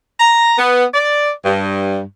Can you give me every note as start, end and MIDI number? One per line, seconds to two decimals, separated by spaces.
0.20 0.54 82
0.58 0.84 59
0.94 1.30 74
1.45 2.00 43